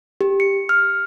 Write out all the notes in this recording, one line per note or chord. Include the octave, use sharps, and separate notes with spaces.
G4
C#7
F6